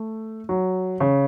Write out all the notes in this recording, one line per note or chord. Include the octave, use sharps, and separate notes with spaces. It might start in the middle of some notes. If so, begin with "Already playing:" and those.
Already playing: A3
F#3
C#3